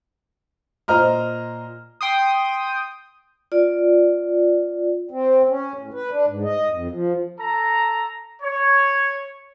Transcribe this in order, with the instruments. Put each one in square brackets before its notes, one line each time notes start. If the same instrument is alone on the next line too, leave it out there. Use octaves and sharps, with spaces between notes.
[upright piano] A#2 C5 D#5 A#5 F6
[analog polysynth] G5 C6 D#6
[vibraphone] F4 D5
[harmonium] C4
C#4
A2
B4
D4
G#2
D#5
F2
F3
[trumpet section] A4 A#5
C#5